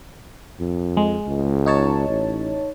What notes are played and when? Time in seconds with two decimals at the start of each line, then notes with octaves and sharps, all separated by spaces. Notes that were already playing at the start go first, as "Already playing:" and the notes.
0.59 F2
0.97 G#3
1.27 C#2
1.66 D#4 C#5 A5
2.08 A1